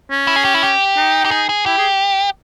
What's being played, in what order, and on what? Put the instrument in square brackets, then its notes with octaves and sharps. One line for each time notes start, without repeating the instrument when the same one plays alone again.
[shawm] C#4
[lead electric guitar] E4
G#4
G4
E4
G4
[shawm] D#4
[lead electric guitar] G4
G#4
G#4
[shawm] E4 [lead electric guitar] G4
[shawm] G#4